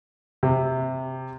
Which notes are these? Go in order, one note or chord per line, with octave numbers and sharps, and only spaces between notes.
C3